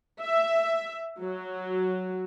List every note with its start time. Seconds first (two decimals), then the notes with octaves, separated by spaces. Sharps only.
0.20 E5
1.19 F#3